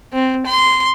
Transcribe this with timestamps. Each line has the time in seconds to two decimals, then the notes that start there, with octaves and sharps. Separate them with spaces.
0.13 C4
0.46 C6